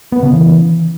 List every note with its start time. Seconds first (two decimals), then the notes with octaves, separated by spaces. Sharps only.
0.12 B3
0.23 C#3
0.33 E3